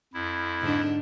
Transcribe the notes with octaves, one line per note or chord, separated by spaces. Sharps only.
F2 E4
G#2 D3 D4